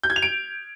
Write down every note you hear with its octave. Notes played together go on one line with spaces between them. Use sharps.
G6
G#6
F7
D7